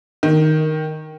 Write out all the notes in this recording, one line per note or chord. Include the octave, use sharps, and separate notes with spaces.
D#3